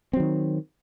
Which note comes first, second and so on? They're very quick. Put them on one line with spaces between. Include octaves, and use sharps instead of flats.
C4 F#3 D#3